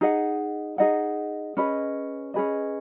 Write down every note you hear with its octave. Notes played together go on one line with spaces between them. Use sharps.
D#4 G#4 D#5 F#5
D#4 G#4 D#5 F#5
C#4 G#4 B4 D#5
C#4 G#4 B4 D#5